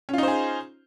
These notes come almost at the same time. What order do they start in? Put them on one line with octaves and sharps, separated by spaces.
C#4 F4 D#4 C5 G#4